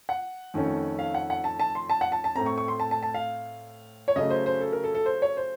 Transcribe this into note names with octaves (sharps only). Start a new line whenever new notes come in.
F#5
F2 D#3 A3 C#4
F5
F#5
F#5
A5
A5
C6
A5
F#5
A5
A5
A2 A3 C4 A#5
C#6
C#6
C6
A5
A5
A5
F5
C#5
C#3 F#3 A3 C#4 D#5
C5
C5
A4
A#4
A4
A4
C5
C#5
C5